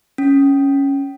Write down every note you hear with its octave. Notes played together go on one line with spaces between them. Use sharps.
C#4